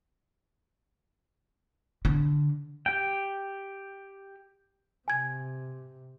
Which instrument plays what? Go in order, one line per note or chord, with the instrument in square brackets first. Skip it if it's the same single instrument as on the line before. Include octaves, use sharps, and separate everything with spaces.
[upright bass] D3
[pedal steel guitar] G4 G5
[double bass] C3 [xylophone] G#5 G#6